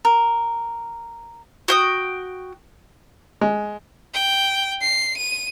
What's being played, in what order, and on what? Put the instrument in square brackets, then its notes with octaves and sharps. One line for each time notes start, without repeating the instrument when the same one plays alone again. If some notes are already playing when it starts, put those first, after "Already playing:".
[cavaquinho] A#4
[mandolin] F#4 G5 D#6
[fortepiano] G#3
[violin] G5
C7
D#7